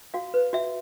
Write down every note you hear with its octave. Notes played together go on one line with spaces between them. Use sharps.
F#4 F5
B4
F#4 E5